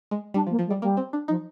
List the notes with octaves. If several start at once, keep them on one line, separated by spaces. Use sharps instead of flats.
G#3
G3 D4
F3
A#3
F3
G#3
G3
G3 A#3
C4
D4
F3 D#4